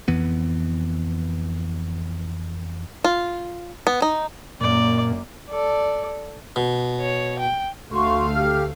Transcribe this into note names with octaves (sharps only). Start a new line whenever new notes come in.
F2 E3 B3
F4
B3
D#4
F#2 A#2 A#3 D5
A4 D5
B2
C#5
G5
D2 A3 F#4 F5 C6 C#6
G4 F6